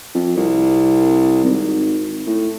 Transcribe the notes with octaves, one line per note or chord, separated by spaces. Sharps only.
F2
C2
G#1
A2